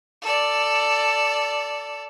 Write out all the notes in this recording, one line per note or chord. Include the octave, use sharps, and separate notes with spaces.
A4 D5